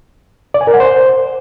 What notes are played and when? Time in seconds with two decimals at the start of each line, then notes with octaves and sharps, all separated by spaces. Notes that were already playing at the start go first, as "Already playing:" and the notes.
0.54 D5
0.61 G#5
0.67 A#4
0.74 F#5
0.80 C5